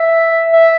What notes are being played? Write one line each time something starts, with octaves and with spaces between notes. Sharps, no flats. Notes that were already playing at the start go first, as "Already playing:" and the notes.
Already playing: E5
E5